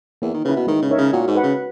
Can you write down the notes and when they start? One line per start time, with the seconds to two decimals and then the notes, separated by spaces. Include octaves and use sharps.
0.22 E2 A#3
0.34 D#3
0.45 C#3 E4 B4
0.56 B2
0.67 D#3 G#3
0.82 C#3
0.90 D#4 A#4 C#5 E5
0.98 C#3
1.13 A#2 F#4
1.27 G#2
1.35 B4 F#5
1.43 C#3